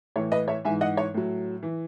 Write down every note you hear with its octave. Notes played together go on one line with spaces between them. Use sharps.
A2 E3 C#5
B4 D#5
C#5 E5
G#2 E3 E5 G#5
D#5 F#5
C#5
A2 F#3
E3